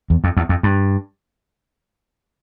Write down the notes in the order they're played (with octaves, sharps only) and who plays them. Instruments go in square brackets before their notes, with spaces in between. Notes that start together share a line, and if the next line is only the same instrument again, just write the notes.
[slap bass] E2
F2
E2
F2
G2